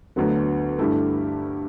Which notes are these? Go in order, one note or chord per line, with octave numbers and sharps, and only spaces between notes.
D2 D3 F#3 B3
G2 D3 A3 E4 G4